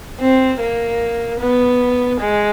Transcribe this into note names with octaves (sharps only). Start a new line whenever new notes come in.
C4
A#3
B3
G#3